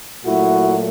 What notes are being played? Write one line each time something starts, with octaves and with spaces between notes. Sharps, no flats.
A#2 F#3 A3 E4 F#4